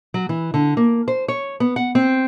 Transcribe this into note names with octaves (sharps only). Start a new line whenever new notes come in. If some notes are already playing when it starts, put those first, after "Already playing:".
F#3
E3
D3
A#3
C5
C#5
B3
F#5
C4